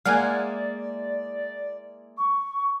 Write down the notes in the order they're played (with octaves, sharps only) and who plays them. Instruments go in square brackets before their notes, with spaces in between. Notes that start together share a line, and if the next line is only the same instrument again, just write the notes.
[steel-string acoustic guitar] G#3 A#3 E4 [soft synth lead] D5 [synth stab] F5 F#5 G#5
[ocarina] C#6